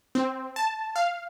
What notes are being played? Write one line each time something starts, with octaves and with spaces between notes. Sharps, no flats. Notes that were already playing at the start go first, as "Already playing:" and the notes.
C4
A5
F5